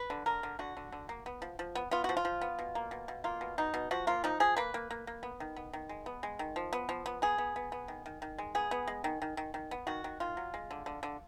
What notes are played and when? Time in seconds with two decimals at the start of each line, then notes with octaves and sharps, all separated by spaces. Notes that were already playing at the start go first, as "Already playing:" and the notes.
Already playing: B4
0.10 D3
0.26 D3 A#4
0.43 D3
0.59 D3 F#4
0.77 D3
0.92 D3
1.09 A#3
1.26 B3
1.42 F3
1.59 F3
1.75 B3
1.91 B3 F4
2.04 F3 F#4
2.17 F4
2.25 F3
2.41 B3
2.59 B2
2.75 A#3
2.91 B2
3.08 B2
3.24 A#3 F4
3.41 B2
3.58 B2 D#4
3.74 B2
3.91 F3 F#4
4.07 A#3 F4
4.24 F3 D#4
4.40 F3 G#4
4.57 A#3 B4
4.74 A#3
4.91 A#3
5.07 A#3
5.23 B3
5.40 D#3
5.56 B3
5.73 D#3
5.89 G#3
6.06 B3
6.23 G#3
6.39 D#3
6.56 F3
6.73 B3
6.89 F3
7.06 B3
7.22 B3 G#4
7.38 B3
7.56 B3
7.72 B3
7.88 D#3
8.06 D#3
8.22 D#3
8.39 G#3
8.55 B3 G#4
8.71 B3
8.88 G#3
9.04 D#3
9.22 D#3
9.37 D#3
9.54 D#3
9.71 B3
9.87 D#3 F#4
10.04 D#3
10.20 D#3 F4
10.37 F#3
10.54 G#3
10.71 D3
10.86 D3
11.03 D3